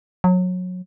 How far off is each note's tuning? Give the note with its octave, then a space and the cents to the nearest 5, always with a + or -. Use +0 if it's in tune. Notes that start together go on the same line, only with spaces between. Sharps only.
F#3 -25